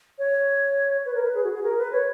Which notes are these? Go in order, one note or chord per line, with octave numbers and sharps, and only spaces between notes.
C#5
B4
A#4
B4
G#4
F#4
G#4
A#4
B4
C#5